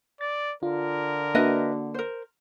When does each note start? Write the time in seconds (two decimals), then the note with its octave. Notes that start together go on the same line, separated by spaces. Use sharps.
0.21 D5 A6
0.63 D3 F4 A#4
1.35 A#3 D4 F#4 B4 D#5 E5
1.94 A#4 C5